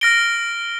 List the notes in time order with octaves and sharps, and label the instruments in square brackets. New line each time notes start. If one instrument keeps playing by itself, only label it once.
[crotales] F6 A#6 D7 G7